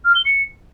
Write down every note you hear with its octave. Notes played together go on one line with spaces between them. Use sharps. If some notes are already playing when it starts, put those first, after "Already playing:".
F6
G7
C#7